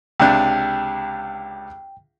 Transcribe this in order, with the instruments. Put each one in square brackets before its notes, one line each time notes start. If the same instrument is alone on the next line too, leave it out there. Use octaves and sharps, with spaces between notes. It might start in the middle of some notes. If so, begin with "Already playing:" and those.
[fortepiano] C#2 C3 D4 [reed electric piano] G5